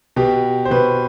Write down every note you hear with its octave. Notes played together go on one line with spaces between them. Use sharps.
B2 G4
C5
B2 B4